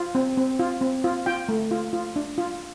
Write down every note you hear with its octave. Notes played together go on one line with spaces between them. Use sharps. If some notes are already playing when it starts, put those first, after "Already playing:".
Already playing: F4
C4
C4
F4
C4
F4
F4 G5
A3
F4
F4
D4
F4